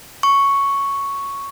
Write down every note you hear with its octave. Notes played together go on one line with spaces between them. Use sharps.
C#6